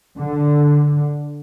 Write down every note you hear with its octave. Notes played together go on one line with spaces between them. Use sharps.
D3